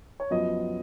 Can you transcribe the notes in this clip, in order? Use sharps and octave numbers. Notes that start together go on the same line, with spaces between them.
C#5
F#2 F3 B3 D#5